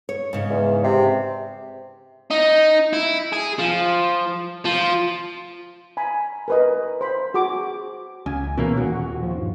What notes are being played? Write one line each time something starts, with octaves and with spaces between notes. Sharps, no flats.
C#5
G#2 C#3
E2
C3
D#4
E4
G#4
F3
F3
G#5 A#5 B5
A#4 B4 D#5
C5 B5
F#4 G#4 D6
C#2 G#5
B2 E3 A#3 C#4
D#1 F#4
F3
G2